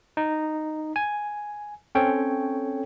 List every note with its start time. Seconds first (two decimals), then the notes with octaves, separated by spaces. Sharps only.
0.17 D#4
0.96 G#5
1.95 C4 C#4 A4 C#5 G5